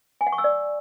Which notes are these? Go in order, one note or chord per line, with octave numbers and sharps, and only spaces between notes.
G#5
F#5
C#6
E6
D5